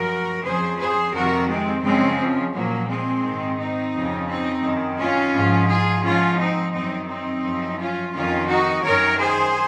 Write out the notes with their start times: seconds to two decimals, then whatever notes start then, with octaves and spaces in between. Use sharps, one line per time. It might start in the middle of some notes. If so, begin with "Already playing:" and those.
Already playing: F#2 F3 F#4 A#4
0.43 F2 C#3 F3 G#4 C5
0.78 G#4 C5
1.13 F2 C3 D#3 F#4 A#4
1.49 G#3 C4
1.83 F#2 C#3 F3 G#3 C4
2.18 F3
2.53 A#2 F3 F#3 A#3
2.88 G#3 C4
3.23 G#2 D#3
3.58 C4 D#4
3.94 F2 C#3 F3
4.28 C4 D#4
4.63 F#2 D#3
4.98 C#4 F4
5.34 G#2 F3
5.68 F4 G#4
6.03 G#2 F3 C#4 F4
6.39 C4 D#4
6.73 F#2 D#3 C4 D#4
7.09 C4 D#4
7.44 F#2 F3
7.78 C#4 F4
8.14 F2 D#3 C#4 F4
8.48 D#4 F#4
8.83 F#2 D#3 A#4 C#5
9.19 G#4 C5